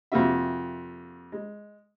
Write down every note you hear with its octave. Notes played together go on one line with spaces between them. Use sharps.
F2 C3 A#3 F4 F#4 E5
G#3